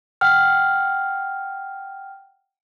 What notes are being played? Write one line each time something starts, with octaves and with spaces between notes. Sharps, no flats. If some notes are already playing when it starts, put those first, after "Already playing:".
F#5 G5 F6